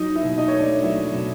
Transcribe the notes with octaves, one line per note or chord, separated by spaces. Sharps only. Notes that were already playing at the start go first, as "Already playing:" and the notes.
Already playing: F#3 D#4 D#5
E4 E5
B2
D#4 D#5
A3 C#5
D4 D5
F#3 E4 E5
B2